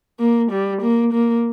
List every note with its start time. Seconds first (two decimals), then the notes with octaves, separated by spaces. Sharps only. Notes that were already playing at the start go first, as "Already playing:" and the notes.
0.19 A#3
0.51 G3
0.82 A#3
1.13 A#3